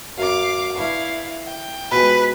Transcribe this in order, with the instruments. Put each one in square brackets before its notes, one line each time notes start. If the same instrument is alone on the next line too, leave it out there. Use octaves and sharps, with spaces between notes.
[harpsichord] F#2 [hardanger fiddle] F5 D6
[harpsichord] D4 B4 C#6 [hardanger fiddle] E4 F5
[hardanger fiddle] G5
[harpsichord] B2 F3 G#3 [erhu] B4